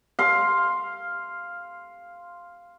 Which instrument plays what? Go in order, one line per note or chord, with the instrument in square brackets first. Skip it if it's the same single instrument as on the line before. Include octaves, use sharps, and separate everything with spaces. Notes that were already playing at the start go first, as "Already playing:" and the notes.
[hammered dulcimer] F5 C6